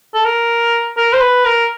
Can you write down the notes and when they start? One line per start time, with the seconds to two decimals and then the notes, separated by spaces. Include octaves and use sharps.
0.14 A4
0.25 A#4
0.97 A#4
1.13 C5
1.21 B4
1.45 A#4